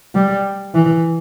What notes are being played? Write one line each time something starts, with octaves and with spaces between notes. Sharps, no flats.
G3
E3